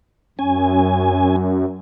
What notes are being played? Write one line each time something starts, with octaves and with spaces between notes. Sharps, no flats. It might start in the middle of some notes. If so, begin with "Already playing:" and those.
F#2 C#4 G#5